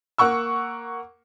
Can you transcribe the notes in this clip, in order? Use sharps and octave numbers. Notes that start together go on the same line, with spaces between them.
A#3 F#5 C#6 E6